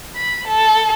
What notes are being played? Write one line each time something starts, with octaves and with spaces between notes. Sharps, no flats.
B5
A4